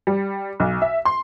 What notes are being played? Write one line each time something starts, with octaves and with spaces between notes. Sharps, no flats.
G3
B1
E5
C6